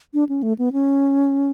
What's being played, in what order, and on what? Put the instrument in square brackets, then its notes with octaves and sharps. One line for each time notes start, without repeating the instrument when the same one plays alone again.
[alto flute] D4
C#4
A3
B3
C#4